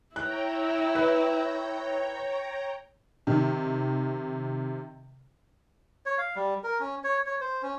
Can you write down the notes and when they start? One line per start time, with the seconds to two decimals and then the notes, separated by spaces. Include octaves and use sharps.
0.16 E4 C#5 G5 A#5 F#6
0.95 B4
3.27 C3 D#3
6.06 C#5
6.18 F5
6.36 G3
6.64 A#4
6.80 C#4
7.04 C#5
7.26 C#5
7.41 C5
7.63 C#4